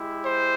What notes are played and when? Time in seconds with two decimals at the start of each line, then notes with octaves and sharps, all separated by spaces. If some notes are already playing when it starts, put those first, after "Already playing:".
Already playing: G#3 E4 G4
0.25 C5